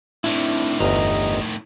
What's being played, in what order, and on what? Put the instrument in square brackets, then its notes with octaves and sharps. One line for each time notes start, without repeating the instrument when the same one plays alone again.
[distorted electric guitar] A2 D#3 [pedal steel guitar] C4 D4 E4
[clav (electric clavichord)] G1 E2 [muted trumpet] D#5 [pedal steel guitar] A#5